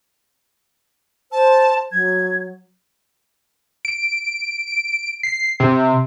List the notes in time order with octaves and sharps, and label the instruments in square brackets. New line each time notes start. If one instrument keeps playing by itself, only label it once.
[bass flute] C5 [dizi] A5
[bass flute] F#3 [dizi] G#6
[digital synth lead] D7
D7
C7
C3